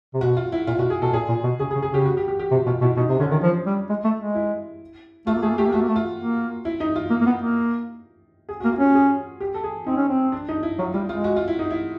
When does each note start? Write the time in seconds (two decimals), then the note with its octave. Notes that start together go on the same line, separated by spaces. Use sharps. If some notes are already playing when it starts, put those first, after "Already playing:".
0.14 C3
0.21 B2 F#4
0.37 F4
0.52 E4
0.67 A#2 F4
0.79 B2 F#4
0.90 G#4
1.02 B2 A4
1.13 A#2 G#4
1.29 A#2
1.44 B2
1.59 C#3 G#4
1.71 G#4
1.75 C#3
1.82 G#4
1.90 C#3 G4
2.05 F#4
2.17 G4
2.28 G4
2.39 G4
2.51 C3 F#4
2.66 B2 F4
2.81 B2 E4
2.97 B2 D#4
3.08 C3 D4
3.20 D3 C#4
3.31 D#3 F4
3.43 F3
3.66 G3
3.90 G#3
4.04 A3
4.20 G#3
4.35 E4
5.27 A3 F4
5.35 A#3
5.42 A3 G#4
5.50 A#3
5.58 A3 G4
5.66 A#3
5.72 A3 F#4
5.82 A#3
5.88 A3
5.96 F4
6.19 A#3
6.65 E4
6.80 D#4
6.96 F4
7.10 A#3
7.21 A#3
7.26 B3
7.42 A#3
8.49 G#4
8.60 A#3 F#4
8.72 F4
8.79 C#4 F#4
8.95 G#4
9.40 G4
9.54 A4
9.64 G#4
9.87 C4 D#4
9.97 C#4
10.08 C4
10.32 D4
10.49 D#4
10.63 E4
10.79 F#3 F4
10.94 G3 F4
11.09 G#3 F4
11.24 F#4
11.36 F4
11.48 E4
11.59 D#4
11.70 E4